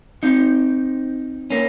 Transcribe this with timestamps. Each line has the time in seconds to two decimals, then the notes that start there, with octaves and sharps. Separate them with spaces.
0.23 C4 D#4
1.50 A#3 C#4